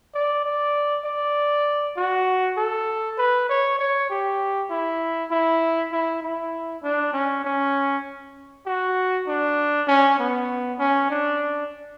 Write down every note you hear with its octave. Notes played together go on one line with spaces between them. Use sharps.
D5
D5
D5
F#4
A4
B4
C#5
C#5
G4
E4
E4
E4
E4
D4
C#4
C#4
F#4
D4
C#4
B3
C#4
D4